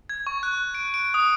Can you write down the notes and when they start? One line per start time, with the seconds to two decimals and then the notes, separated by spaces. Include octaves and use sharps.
0.09 G#6
0.27 C#6
0.43 F#6
0.75 D7
0.94 D7
1.14 D#6